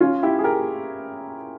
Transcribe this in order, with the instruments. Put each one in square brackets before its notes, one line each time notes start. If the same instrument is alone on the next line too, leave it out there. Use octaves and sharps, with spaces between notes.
[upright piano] C#4 F4
E4 G4
G#4
G4 A#4